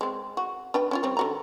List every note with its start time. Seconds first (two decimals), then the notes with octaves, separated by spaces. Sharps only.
0.01 G#3 C4
0.37 F#4
0.74 D4 B4 G5
0.91 C#4 E4 F4
1.03 G3 C4 C#5
1.17 D3 F#4 A#5